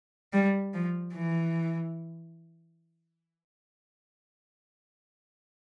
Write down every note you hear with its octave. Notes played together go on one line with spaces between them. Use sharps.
G3
F3
E3